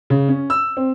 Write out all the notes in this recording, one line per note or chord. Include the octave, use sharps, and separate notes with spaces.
C#3
C#4
E6
C4